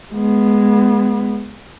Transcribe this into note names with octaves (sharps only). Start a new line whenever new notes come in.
G#3 B3